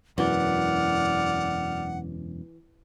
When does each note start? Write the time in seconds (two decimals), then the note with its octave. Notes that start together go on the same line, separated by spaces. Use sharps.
0.18 E1 F#2 E3 D5 F#5 F6